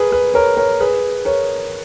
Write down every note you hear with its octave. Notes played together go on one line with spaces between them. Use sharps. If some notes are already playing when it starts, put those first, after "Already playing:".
Already playing: G#4 A#4 B4
G#4 B4
A#4 C#5
A#4 C#5
G#4 B4
A#4 C#5